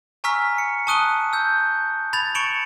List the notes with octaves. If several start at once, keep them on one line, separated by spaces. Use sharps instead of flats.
G#5 A#5 C#6 E6 F6 B6
C#7
A5 C#6 D#6 F#6 D#7 G7
E6 G6
B5 G#6 A6 F7
C#6 C#7 D7 E7 F#7